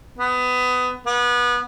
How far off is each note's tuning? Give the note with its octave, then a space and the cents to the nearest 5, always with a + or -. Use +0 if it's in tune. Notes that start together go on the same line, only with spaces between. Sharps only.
B3 +20
B3 -25